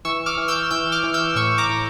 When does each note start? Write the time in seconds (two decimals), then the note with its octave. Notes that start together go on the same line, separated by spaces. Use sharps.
0.05 E3 C#6 E6
0.26 D6 F6
0.38 E3
0.48 E6 G6
0.71 E3 E6 G6
0.92 D6 F6
1.03 E3
1.14 E6 G6
1.36 A2 C#6 E6
1.58 A#5 D6
1.69 A2